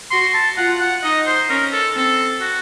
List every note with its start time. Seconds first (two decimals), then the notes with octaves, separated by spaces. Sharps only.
0.11 F#4 C6
0.34 A5
0.57 F4 F#5
0.80 F#5
1.03 D#4 D#5
1.27 C5
1.50 C#4 A#4
1.73 A4
1.95 C4 A4
2.41 F#4